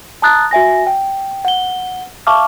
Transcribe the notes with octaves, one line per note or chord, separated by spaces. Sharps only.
A5 A#5 D#6 F#6 A6
F#4 E5 G#5 A#6
G5
F#5 G7
E5 F5 A5 C#6 D6 F6